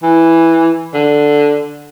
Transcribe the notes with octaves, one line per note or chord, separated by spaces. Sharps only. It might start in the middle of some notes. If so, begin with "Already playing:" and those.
E3
D3